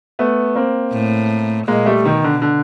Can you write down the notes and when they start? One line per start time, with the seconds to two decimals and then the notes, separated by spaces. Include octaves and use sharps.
0.19 A3 B3
0.55 A#3 C4
0.93 A2
1.67 A#2 G#3 A#3
1.86 G3 A3
2.05 B2 D#3
2.24 D3
2.42 D3